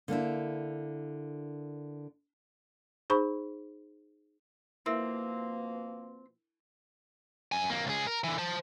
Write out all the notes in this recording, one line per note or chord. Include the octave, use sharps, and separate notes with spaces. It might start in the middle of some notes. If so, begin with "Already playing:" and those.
D3 A#3 D4 E4
D#4 G#4 C5 B5 C#6
B2 F3 A#3 C4 E4 A#4 E5
F#2 G#5
F2 A#3
C#2 G#4
A#4
D3 E3
C5 A5